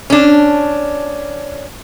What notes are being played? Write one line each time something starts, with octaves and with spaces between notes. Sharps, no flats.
C#4 D4